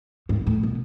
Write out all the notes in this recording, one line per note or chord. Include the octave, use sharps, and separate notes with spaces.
G#2
A2
B2